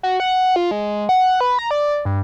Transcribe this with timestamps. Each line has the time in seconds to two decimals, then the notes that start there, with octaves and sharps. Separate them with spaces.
0.03 F#4
0.20 F#5
0.56 F4
0.71 G#3
1.09 F#5
1.41 B4
1.59 A#5
1.71 D5
2.05 G2